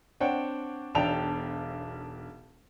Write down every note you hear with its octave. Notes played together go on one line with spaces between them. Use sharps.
C4 D4 C#5 F#5 G5
E1 B1 D4 G5 A5 F7